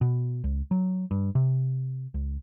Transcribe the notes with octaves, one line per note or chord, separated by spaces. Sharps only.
B2
C#2
F#3
G2
C3
C#2